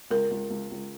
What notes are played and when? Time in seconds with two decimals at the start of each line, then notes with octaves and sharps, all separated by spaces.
0.11 C#2 A#4
0.31 C#2
0.50 C#2
0.71 C#2